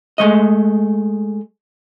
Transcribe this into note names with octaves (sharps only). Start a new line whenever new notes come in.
G#3 A3 D#5